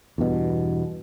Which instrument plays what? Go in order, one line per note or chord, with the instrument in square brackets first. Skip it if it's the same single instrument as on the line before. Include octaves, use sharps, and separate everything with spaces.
[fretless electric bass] E2 G2 B2